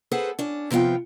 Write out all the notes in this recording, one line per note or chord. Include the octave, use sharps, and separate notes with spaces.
G#4 A4 B4 C5 F#5
C#4 D4
C3 F3 B3 F4 G5